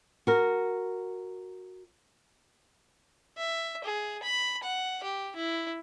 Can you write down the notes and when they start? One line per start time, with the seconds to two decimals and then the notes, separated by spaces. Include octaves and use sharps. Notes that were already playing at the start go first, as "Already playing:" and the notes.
0.27 F#4 A#4
3.37 E5
3.84 G#4
4.23 B5
4.63 F#5
5.03 G4
5.36 E4